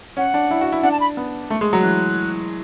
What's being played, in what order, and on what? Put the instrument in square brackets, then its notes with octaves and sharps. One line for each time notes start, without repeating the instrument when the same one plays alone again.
[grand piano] C#4 [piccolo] F#5
[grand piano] D4
E4
F#4
E4
[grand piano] D4 [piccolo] F#5
[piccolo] A5
B5
[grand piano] B3
A3
G#3
F#3
[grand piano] E3 [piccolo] F#6